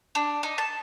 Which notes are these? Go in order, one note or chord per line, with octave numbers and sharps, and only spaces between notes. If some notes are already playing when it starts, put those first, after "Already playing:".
D4
D#4
A5